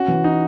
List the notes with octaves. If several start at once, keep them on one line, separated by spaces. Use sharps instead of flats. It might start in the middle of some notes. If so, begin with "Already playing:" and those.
Already playing: C#4 F#4
E3
C#4 D#4